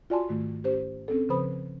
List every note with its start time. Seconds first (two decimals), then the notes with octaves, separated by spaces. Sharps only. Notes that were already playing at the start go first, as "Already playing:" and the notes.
0.10 F4 F#4 D5 G#5 A5 C6
0.29 G#2 D#3 A3
0.64 C#4 G4 C5
1.08 C4 C#4 A4
1.29 C#3 F3 B4 C5 B5 D#6